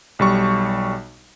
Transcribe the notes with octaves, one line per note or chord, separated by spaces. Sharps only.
B1 G3 C#6